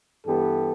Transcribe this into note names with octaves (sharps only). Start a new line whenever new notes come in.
G2 E3 G3 B3 G4 A4